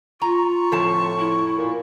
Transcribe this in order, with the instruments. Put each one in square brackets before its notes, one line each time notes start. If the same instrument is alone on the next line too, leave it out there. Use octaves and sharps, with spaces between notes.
[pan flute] F4 [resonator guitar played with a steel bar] A#5 [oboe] C#6
[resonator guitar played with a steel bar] F2 F3 A5 [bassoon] A2
[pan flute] E4
[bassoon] A#2